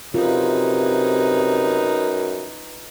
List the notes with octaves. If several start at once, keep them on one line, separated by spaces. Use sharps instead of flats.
F#2 C3 D#4 F4 B4